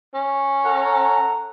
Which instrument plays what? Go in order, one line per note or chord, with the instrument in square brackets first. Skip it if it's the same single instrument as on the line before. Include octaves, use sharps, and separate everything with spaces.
[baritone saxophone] C#4
[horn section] A4 F#5 A#5